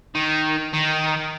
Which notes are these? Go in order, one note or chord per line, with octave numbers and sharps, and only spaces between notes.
D#3
D#3